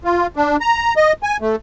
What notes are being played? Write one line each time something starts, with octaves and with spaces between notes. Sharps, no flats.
F4
D4
A#5
D#5
G#5
A3